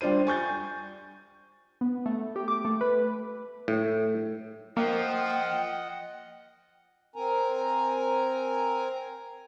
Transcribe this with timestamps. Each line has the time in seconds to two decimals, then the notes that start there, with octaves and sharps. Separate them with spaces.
0.01 G3 D4 F4 C5 D#7
0.27 G#5 C#6 G6 A6
1.81 B3
2.06 A3
2.36 G4
2.48 D6
2.65 A3
2.81 B4
3.68 A2
4.77 F3 A#3 D#5 F#5 G5
7.16 C4 A#4 G#5 A#5